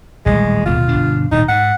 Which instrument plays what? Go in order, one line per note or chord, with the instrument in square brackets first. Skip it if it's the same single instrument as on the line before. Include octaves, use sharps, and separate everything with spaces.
[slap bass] D#1 A1 G3 [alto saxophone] G#3
[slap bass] D1 B2 [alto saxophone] F4
[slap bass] G1 B2 D4
[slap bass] D#1 A2 [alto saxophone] D#4
[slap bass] G#2 [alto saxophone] F#5